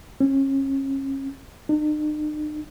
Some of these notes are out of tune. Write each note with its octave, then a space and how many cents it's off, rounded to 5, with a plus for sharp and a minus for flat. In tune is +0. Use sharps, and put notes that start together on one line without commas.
C#4 -30
D#4 -45